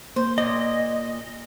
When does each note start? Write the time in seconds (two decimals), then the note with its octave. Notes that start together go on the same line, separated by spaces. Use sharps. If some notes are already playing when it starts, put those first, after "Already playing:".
0.16 A#3 C5
0.38 A#2 D#5